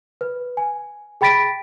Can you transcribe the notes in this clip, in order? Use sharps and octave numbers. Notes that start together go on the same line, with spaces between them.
B4
G#5
G#4 G5 B5 A6 B6 D7